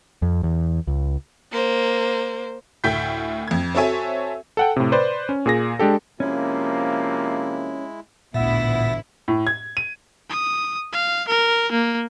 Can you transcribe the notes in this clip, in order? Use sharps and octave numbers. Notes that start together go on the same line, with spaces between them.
F2
E2
C#2
A#3 C5
D2 A2 A3 G5 G6 B6
F2 G#6
C4 F#4 A4 C#5 E5 G#5
A4 F#5 G5
A2 C3
B4 C5 D5
C#4
A#2 G#4 A#6
G#3 D4 G4 A4
C3 F3 G#3 A#3 C#4 E4
A1 D2 A#2 B3 E4 E5
A2
G#6
D#7
D#6
F5
A#4
A#3